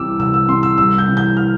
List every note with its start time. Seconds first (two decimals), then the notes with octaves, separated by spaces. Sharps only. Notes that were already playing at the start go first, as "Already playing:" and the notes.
Already playing: C2 C3 E3 D6 E6
0.19 C2 E6
0.34 E6
0.48 C3 E3 C6
0.63 E6
0.78 C2 E6
0.98 G6
1.08 C3 E3
1.17 G6
1.37 F6